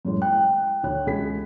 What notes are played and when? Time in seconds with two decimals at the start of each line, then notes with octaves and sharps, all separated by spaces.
0.05 F#2 A2 G#3
0.22 G5 F#6
0.83 D2 C#5 F#6
1.06 C#2 G#4 B6